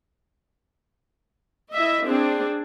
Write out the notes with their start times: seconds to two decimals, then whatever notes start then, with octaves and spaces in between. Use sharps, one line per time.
1.72 E4 D#5 E5
2.04 C4 D4 G#4